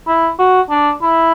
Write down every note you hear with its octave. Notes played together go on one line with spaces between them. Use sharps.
E4
F#4
D4
E4